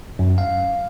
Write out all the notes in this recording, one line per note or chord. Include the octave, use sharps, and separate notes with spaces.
F#2
F5